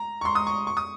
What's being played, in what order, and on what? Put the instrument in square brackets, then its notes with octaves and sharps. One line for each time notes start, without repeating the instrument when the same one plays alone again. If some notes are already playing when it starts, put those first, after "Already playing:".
Already playing: [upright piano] A#5
C#6
C6
D#6
C#6
C#6
D#6